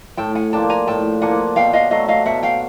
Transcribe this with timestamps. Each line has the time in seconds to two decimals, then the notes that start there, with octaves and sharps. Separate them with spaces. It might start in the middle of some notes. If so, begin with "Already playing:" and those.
0.17 A2 G5 A5
0.35 F#5 G#5
0.53 F3 A#3 D4 G5 A5
0.70 G#5 A#5
0.87 A2 G5 A5
1.22 F3 A#3 D4 F#5 G#5
1.56 B2 F5 G5
1.73 D#5 F5
1.91 F#3 A3 D#5 F5
2.08 D#5 F5
2.26 B2 E5 F#5
2.43 F5 G5